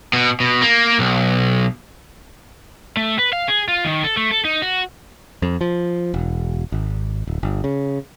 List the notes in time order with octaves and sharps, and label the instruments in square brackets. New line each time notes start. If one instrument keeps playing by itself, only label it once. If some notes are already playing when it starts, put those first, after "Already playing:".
[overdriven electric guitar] B2
B2
A#3
B1
A3
B4
F5
G#4
F4
D#3
A4
A3
A4
D#4
F#4
[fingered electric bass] F2
F3
E1
G#1
D1
G1
C#3